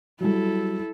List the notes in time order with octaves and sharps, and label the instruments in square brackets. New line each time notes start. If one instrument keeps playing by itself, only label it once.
[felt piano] F#3 G3 [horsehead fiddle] E4 A4